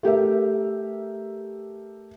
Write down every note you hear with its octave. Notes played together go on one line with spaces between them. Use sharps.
A3 G4 A#4 E5